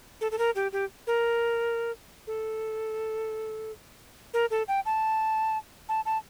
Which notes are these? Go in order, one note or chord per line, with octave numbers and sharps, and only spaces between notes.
A4
A4
A#4
G4
G4
A#4
A4
A#4
A4
G5
A5
A5
A5